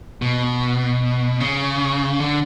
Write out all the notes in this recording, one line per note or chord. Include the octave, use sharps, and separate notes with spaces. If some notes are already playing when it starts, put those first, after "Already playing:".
B2
C#3
D3